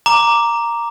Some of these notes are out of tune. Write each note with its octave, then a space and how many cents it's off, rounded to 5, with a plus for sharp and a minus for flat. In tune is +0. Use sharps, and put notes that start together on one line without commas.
A#5 +0 D6 +0